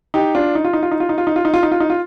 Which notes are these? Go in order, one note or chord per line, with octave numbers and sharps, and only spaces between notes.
D#4 G4
D4 F4
D#4
F4
D#4
F4
D#4
F4
D#4
F4
D#4
F4
D#4
F4
D#4
F4
D#4
F4